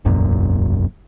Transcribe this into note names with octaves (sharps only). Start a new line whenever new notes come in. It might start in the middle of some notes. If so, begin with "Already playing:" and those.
E1 C2 F#2 A#2